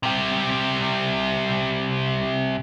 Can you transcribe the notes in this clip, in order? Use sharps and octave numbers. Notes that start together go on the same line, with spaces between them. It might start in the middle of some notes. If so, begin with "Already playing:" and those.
C3 G3